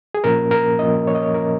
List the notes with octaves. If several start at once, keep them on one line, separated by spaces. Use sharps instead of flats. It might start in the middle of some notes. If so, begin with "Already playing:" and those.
G#4
A#2 F3 A#3 C#4 A#4
A#4
A#2 F3 A#3 C#4 D#5
C#5
D#5
C#5
A#2 F3 A#3 C#4 A#4